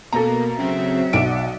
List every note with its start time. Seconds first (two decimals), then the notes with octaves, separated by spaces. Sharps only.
0.13 B2 A#3 A4 A#5
0.58 C#3 F#3 C4 E5
1.13 B1 D5 F#5 D7